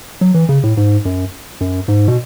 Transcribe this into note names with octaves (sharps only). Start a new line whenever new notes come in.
F#3
E3
C#3
A2
G#2
F#2
F#2
G#2
B2